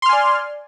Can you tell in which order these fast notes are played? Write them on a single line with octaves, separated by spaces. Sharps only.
C6 F6 G#5 D5